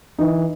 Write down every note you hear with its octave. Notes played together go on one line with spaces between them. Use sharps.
E3 D#4